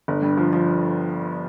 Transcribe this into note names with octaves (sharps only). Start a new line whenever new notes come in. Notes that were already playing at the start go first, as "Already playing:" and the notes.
G1
G2
F3
F3